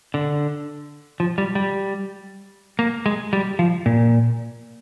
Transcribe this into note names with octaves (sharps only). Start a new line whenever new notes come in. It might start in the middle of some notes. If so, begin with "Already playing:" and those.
D3
F3
G3
G3
A#3
G#3
G3
F3
A#2